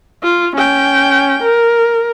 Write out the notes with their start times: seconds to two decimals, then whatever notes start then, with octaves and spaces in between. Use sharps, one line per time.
0.24 F4
0.56 C#4 G5
1.43 A#4